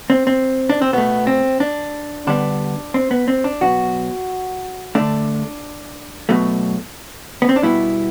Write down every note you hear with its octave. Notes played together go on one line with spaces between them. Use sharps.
C4
C4
D4
C4
B2 A3 B3
C4
D4
D3 G3 B3 D4
C4
B3
C4
D4
B2 F#3 B3 F#4
D3 A3 D4
B2 F#3 A3
B3
C4
D4
B2 G3 B3 E4